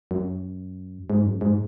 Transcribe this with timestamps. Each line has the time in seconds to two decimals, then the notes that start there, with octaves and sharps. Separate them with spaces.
0.11 F#2
1.10 G#2
1.26 F#2
1.41 G#2